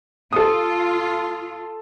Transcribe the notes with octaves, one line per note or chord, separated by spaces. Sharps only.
F4 A4 D#6